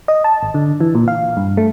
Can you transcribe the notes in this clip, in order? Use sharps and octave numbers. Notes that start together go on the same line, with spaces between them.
D#5
A5
G#1
D3
E3
A#2
F5
G2
A3